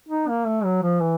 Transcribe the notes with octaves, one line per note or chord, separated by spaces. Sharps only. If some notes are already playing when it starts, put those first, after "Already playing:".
D#4
A#3
A3
F#3
F3
E3